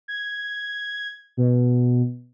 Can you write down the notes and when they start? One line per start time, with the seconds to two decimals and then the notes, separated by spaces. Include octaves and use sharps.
0.08 G#6
1.37 B2